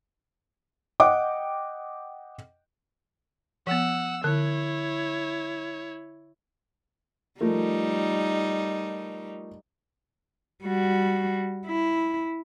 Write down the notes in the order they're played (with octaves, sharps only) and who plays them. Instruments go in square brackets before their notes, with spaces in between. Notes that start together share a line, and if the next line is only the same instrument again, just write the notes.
[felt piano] D#5 F#5 G5 D6
[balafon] F3 B3 [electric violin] F#5 E6
[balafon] D3 [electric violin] E4 C#5
[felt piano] F3 A3 A#4 [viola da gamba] G3 D#4
[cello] G3 F#4
E4